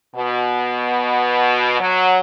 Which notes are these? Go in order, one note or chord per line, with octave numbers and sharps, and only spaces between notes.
B2
F#3